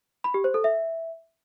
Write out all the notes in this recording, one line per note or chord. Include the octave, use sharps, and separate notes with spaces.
B5
G4
C5
A4
E5